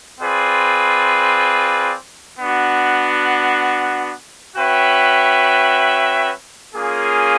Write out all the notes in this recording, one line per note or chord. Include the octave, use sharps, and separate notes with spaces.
C4 F4 G#4 B4 D5
B3 D4 F#4
C#4 F#4 B4 E5 G5
A#3 C#4 F4 G#4